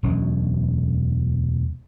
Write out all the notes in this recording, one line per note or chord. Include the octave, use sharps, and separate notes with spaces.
E1 D2 F#3 C#4